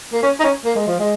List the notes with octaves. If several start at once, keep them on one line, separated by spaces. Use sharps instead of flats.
A#3
C#4
D#4
C#4
A#3
G#3
F3
G#3